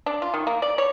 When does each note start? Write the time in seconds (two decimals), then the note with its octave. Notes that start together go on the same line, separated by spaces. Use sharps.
0.06 D4
0.22 F4
0.34 D#3
0.47 A#3
0.62 D5
0.78 C#5